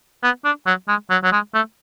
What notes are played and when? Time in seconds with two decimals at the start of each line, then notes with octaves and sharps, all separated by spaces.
0.23 B3
0.45 D4
0.66 F#3
0.88 G#3
1.10 F#3
1.24 F#3
1.32 G#3
1.54 A3